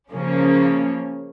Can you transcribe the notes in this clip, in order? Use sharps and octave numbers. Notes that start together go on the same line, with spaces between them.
C#3 F3 A#3 C#4